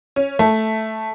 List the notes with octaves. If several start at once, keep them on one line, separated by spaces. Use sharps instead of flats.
C#4
A3